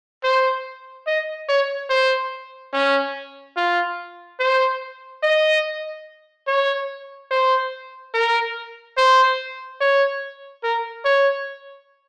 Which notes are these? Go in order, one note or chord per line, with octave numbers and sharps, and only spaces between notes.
C5
D#5
C#5
C5
C#4
F4
C5
D#5
C#5
C5
A#4
C5
C#5
A#4
C#5